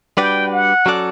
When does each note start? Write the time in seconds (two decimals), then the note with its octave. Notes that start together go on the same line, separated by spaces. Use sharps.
0.17 G3 D4 F#4 B4 D5 G5
0.52 F#5
0.86 F#3 C#4 F#4 A4 D5